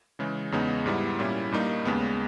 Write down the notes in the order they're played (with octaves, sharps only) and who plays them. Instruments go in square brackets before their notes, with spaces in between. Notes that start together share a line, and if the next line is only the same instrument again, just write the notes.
[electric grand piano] C#3 E3 G#3
E2 C#3 G#3 B3 D#4
G#2 G3 B3 E4
A#2 G3 C#4 E4
G2 G3 A#3 D#4
D#2 C#3 G#3 B3